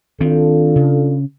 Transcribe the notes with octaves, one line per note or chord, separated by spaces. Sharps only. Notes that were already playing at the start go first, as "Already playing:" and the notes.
D#3 C4 D4 F4 A4
C#3